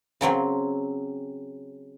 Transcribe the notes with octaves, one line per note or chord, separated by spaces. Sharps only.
C#3 F#3 C4 C#4